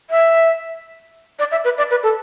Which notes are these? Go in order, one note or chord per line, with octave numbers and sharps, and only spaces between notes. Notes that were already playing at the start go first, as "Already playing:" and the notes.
E5
D5
E5
B4
D5
B4
A4